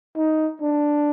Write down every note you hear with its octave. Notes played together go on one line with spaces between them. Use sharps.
D#4
D4